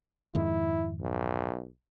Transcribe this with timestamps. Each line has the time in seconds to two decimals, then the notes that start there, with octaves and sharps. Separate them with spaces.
0.35 F2 G#2 D#3 E4
1.01 B1